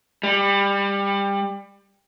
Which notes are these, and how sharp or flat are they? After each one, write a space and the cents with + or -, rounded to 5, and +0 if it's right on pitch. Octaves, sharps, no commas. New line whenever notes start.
G3 +25